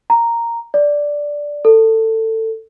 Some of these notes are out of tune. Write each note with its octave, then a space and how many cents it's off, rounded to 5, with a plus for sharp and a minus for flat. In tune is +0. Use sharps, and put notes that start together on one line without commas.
A#5 -5
D5 -5
A4 +20